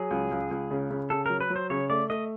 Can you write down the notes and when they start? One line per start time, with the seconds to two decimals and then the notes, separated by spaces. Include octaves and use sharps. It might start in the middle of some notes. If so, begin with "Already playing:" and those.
Already playing: F#3 G#4
0.11 C#2
0.31 C#2
0.51 C#2
0.71 C#3
0.90 C#3
1.10 C#3 A4
1.26 F#3 A#4
1.41 B4
1.50 F#3
1.56 C5
1.70 C#3 C#5
1.90 A3 D5
2.10 A3 D#5